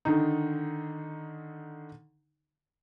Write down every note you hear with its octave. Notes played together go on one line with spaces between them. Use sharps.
D3 D#3 D#4